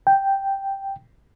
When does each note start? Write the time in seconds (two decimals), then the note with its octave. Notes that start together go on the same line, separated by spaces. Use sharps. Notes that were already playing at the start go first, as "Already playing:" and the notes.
0.07 G5